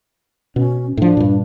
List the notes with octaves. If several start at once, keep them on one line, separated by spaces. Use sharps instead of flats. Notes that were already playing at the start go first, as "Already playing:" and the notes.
B2 C#4
A2 F3 D4
G2 A#2